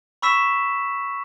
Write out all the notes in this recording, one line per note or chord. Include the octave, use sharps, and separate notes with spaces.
B5 C#6 E6 B6 E7